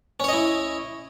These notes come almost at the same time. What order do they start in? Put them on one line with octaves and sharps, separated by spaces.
C#4 C#5 D#5 E4